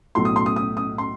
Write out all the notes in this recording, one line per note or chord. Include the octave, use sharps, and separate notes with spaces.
B1 A2 F#3 A3 C6
D#6
C6
D#6
D#6
D#6
C6